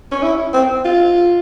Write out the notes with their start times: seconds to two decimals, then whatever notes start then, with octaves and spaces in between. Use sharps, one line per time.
0.11 C#4
0.23 E4
0.53 C4
0.85 F4